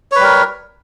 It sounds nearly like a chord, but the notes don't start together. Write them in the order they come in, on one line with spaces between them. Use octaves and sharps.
C#5 B4 G3 A#4